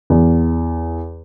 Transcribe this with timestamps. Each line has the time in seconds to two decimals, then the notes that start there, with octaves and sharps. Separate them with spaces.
0.10 E2